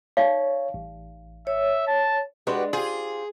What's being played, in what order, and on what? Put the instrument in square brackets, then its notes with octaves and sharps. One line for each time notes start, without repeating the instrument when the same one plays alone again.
[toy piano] D#4 D5 F5 [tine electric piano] C#5
[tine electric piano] A1
[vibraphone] C#5 [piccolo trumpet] E5
[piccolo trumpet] A5
[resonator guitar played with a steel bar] G#3 D4 [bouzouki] F#4 G4 B4
[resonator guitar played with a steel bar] F4 G4 [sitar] G#4 [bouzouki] C5